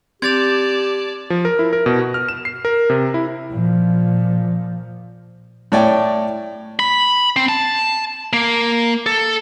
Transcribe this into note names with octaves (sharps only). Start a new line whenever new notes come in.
C4 G4 D5 A5 G#6 A6 F7
F3
A#4
E4
A#4
B2
F#4
F6
E7
C7
A#4
C3
E4
A#2 F3
A2 C#5 D5 G5
B5
C4
A5
A#3
A4